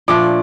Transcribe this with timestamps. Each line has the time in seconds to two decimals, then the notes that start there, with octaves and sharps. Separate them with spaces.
0.08 A#2 F3 A3 D4 D6